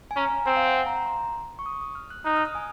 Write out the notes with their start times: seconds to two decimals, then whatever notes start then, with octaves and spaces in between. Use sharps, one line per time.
0.11 G#5
0.16 C#4 A#5
0.46 C4 G#5
0.56 F5
0.66 F#5
0.87 A#5
0.97 A#5
1.06 C6
1.59 C#6
1.66 D#6
1.81 D#6
1.95 F6
2.10 F#6
2.25 D#4 F#6
2.36 F6
2.45 D#6
2.55 G#5